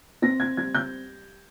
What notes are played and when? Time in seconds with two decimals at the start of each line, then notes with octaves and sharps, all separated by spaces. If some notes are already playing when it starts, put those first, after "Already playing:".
0.22 C4 A#6
0.40 G#6
0.57 G3 G#6
0.75 G6